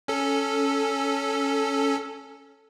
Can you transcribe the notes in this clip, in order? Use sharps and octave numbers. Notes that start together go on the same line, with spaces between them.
C#4 A4